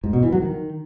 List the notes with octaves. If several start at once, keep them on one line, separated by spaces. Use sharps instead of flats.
G#2
B2
E3
F#3
D#3